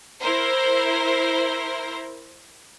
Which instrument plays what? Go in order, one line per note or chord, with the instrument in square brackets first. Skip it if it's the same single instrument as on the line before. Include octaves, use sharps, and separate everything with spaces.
[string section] E4 A#4 C5